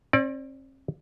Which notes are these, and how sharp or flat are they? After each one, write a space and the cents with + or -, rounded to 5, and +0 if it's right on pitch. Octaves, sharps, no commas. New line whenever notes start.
C4 +45 D5 +0